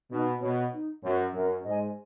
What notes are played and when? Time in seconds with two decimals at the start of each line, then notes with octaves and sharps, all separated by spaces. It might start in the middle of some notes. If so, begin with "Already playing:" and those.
0.11 B2 D#4
0.41 B2 F#4 C#5
0.72 D#4
1.03 F#2 F#4 C#5
1.34 F#2 A#4
1.64 G#2 D#5 G#5